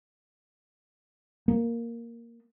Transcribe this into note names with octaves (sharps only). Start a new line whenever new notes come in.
A#3